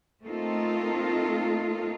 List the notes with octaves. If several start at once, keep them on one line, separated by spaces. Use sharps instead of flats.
A3 A#3 C4 D#4 F4 A4